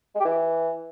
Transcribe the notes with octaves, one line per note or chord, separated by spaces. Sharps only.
G#3
G4
E3